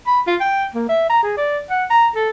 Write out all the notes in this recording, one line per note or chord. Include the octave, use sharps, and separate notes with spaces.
B5
F4
G5
A#3
E5
A#5
G#4
D5
F#5
A#5
A4